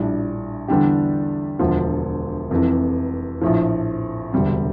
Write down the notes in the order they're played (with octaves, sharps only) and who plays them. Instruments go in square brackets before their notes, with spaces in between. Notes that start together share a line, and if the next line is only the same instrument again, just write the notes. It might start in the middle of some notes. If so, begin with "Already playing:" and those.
Already playing: [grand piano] A#1 A2 G3 D4
E2 D3 G3 D4 G4
E1 D2 D3 F3
F1 F2 C3 E3
A#1 A2 F3
E1 D2 C3 G3 C4